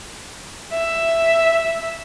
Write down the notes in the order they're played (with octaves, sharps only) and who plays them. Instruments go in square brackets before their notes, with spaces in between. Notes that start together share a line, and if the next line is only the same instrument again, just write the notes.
[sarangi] E5